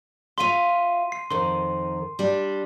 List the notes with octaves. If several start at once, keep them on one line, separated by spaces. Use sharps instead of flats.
F4 E5 F5 C6 D#7
C7
F2 D#3 C6
G3 D4